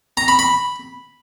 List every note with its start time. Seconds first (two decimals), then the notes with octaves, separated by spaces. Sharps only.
0.17 A#5
0.28 B5
0.39 B5